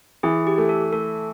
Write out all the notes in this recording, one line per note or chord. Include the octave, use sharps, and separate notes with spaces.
E3 G#4
G4
A3
A4
A3 A4